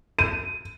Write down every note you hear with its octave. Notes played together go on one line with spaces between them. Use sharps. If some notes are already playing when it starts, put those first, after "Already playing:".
D#7